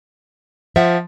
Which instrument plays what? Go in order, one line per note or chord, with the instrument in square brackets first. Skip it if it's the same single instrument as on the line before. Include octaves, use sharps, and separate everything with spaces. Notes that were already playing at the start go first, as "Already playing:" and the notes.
[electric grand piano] F3 [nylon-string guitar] E5 F#5